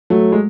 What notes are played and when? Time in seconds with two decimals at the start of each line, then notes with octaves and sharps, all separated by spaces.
0.10 F#3 A3
0.32 G#3